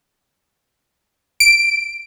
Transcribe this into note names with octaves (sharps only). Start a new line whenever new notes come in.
D7